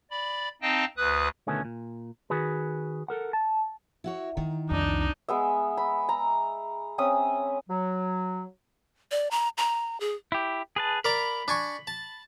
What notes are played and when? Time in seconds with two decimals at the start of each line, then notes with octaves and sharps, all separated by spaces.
0.11 D5 B5
0.62 C4 D#4 D#5 F5 G5 A5
0.97 D2 B4 D#6 F#6
1.47 D2 B2 D#3 A3 B3 C#4
1.65 A#2
2.30 D#3 F#4 G#4 B4
3.08 A4 A#4 F#5
3.33 A5
4.04 E4 F#4 C#5
4.37 D#3 D#4 E4
4.70 C2 F2 D4 D#4
5.28 G#3 B3 E5
5.77 B5
6.09 A#5
6.98 C4 C#4 E5 D#6
7.69 F#3
9.11 D5
9.31 A#5
9.58 A#5
10.00 G#4
10.32 E4 G4
10.76 G#4 B4 A5
11.05 A#4 D5 A#5 B5
11.48 D4 G#5 C#6
11.87 A5